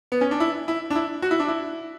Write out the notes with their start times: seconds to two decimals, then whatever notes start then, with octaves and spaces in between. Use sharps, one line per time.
0.12 B3
0.21 C#4
0.31 D4
0.40 E4
0.68 E4
0.90 D4
0.95 E4
1.22 F#4
1.31 E4
1.40 D4
1.48 E4